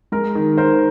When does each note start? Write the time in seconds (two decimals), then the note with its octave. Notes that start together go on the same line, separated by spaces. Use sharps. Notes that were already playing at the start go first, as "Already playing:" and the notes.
0.12 G#3 A#4
0.35 D#3
0.58 D#3 A#4 C5